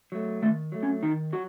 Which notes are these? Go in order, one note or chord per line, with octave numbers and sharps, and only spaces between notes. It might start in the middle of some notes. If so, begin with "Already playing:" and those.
F#3 A3
D#3 A3
F#3 A3
C#4
D#3 D#4
F#3 F#4